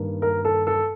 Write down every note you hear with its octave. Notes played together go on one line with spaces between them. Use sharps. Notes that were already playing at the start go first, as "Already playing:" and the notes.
Already playing: G2 D#3 A#3
A#4
A4
A4